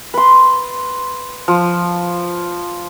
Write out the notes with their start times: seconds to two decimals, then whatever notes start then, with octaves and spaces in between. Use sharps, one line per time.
0.14 B4 C6
1.48 F3